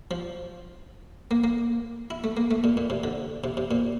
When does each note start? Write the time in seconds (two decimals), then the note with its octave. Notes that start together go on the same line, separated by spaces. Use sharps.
0.11 F3
1.31 A#3
1.44 A#3
2.10 E4
2.24 A3
2.37 A#3
2.51 A3
2.64 A#2
2.77 A#2
2.90 C3
3.04 D3
3.44 C3
3.57 C3
3.71 A#2